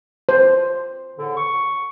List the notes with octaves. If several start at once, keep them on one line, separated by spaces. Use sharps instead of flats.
C5
E2 A2 D3
C#6